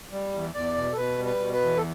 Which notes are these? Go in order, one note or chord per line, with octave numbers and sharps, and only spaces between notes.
G3
E2
E2 D5
B2
A4
B2 B4
G3
B4
B2
B4
E2
A4